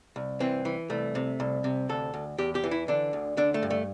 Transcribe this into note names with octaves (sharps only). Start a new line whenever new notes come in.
C2
E3 C4
E3
C2 A3
C3
C2
C3
D2 A4
D2
E2 G4
G4
E3
E4
D3 D4
D2
D3 D4
A3
G2
A3